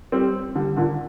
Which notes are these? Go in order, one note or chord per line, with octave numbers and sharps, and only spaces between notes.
G3 C4
D3 G3
A#2 D3